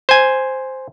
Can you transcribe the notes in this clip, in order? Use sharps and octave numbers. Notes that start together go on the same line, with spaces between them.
C5 G#5